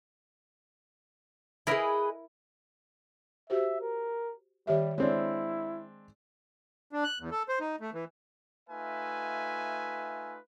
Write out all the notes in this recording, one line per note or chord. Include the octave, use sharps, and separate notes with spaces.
E4 G#4 A#4 B4 D#5
F#4 G4 C5 E5
A#4
D#3 G3 G4 E5
G#3 C4 D4 E4 C#5
D4
F#6
E2
A4
C5
D#4
A3
E3
A3 D#4 F4 B4 E5 G#5